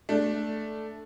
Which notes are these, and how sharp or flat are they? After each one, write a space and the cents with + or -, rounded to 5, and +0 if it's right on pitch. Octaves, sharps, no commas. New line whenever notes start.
A3 +0 D4 +0